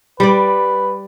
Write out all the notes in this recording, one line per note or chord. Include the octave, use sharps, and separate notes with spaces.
G3 B4 D5